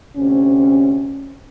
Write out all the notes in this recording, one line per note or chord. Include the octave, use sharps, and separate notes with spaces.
D2 C3 C#4